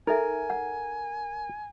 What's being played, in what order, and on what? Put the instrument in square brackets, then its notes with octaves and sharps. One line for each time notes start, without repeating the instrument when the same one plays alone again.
[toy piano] D#4 A4 E5 [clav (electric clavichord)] A#4 [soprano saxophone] G#5
[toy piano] F#5